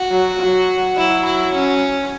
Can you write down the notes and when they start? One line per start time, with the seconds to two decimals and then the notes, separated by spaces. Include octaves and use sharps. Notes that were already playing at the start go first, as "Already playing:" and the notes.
Already playing: F#4
0.11 F#3
0.40 F#3
0.97 F#3 E4
1.25 E4
1.54 C#4